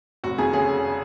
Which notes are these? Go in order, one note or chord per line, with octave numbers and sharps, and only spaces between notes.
F1 F#4
F2 G#4
C#3 G#4